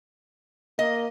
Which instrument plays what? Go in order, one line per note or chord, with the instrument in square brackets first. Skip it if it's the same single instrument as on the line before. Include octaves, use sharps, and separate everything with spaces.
[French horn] A#3 [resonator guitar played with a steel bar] D#5